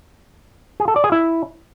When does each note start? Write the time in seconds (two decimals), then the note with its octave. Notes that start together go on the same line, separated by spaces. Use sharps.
0.80 G#4
0.88 A4
0.96 D5
1.04 G#4
1.12 E4